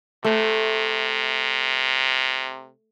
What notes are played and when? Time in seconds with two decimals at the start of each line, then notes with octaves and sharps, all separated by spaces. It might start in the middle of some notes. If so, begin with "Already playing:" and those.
0.24 C3 A3